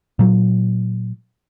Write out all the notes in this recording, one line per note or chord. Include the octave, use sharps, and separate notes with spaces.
A#2 F#3